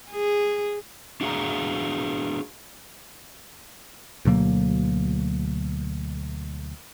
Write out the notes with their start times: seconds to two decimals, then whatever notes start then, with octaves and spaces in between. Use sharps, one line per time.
0.11 G#4
1.21 D4 F#4 G#4 F5 A#5
4.25 D2 B2 F#3 A#3